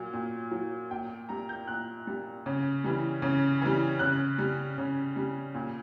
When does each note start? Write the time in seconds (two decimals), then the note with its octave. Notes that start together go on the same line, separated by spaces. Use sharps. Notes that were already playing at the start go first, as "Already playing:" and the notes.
Already playing: A#2 F#3
0.13 A#2
0.51 F#3
0.91 A#2 G5
1.29 G3 A#5
1.49 G6
1.68 A#2 F#6
2.07 G3
2.46 C#3
2.84 E3 G3
3.22 C#3
3.62 E3 G3
3.99 C#3 F#6
4.38 G3
4.78 C#3
5.16 G3
5.54 A#2